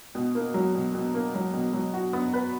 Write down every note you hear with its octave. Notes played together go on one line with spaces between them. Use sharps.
B2
A#3
F#3
B2
B2
A#3
F#3
B2
F#3
F#4
B3
B4